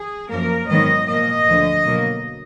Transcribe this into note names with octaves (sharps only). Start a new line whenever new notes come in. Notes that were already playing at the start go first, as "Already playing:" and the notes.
Already playing: G#4
F#2 F3 A#3 A#4
G#2 D#3 F#3 B3 D#5
A#2 F3 A#3 D#5
D2 D3 F3
B2 F#3 A#3